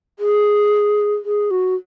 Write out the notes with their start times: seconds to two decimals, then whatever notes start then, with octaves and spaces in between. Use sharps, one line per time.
0.19 G#4
1.25 G#4
1.51 F#4